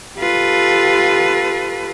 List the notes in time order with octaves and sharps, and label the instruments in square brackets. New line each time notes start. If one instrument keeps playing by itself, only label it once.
[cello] F4 B4 [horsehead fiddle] G4 A4